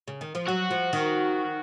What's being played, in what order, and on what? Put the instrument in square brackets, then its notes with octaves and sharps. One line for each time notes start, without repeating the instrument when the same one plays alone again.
[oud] C#3
D#3
F3
[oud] F#3 [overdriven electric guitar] F#4
[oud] F3
D#3